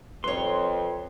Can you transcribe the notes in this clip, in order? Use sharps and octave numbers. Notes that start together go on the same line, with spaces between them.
F2 B4 C#5 C6